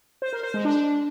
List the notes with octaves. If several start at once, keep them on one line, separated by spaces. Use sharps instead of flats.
C5
A#4
C5
G#3
D4